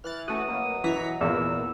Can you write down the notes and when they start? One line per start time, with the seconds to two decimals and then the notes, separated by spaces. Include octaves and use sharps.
0.04 E3 F6 F#6 A6
0.28 A3 C#4 F#4 D#6
0.48 B2 F#3 A#3
0.84 E3 A#5 C#6 B6
1.21 E2 A#2 E3 A#3 E6